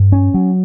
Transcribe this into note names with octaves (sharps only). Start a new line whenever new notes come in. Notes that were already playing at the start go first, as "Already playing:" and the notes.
Already playing: G2
C#4
F#3